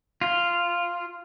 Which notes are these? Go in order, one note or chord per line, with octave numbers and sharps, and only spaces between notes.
F4